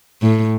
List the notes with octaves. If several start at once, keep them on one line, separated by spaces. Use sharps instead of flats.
A2